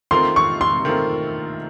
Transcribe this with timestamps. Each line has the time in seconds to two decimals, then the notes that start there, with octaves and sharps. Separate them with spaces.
0.11 D#3 A3 C4 F4 A#4 C6
0.36 C#6
0.61 C6
0.85 D#3 A3 C4 F4 A#4